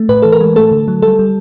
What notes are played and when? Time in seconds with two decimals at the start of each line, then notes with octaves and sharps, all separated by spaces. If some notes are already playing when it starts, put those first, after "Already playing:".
Already playing: A3
0.09 A2 B4
0.22 E3 A4
0.32 A#4
0.40 G#3
0.56 A3 A4
0.71 D3
0.88 F#3
1.02 G3 A4
1.19 G3